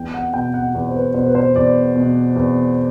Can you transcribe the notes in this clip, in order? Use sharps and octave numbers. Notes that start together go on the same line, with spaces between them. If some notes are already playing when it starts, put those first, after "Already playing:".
Already playing: E2 G5
F#5
B2 G5
F#5
E2
C5
B4
B2 C5
B4
C5
E2 D5
B2
E2